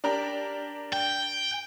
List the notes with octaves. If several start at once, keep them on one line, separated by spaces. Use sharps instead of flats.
D4 G4 A#4
G5